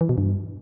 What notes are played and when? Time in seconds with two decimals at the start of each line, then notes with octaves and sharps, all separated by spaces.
0.01 E3
0.09 B2
0.18 G2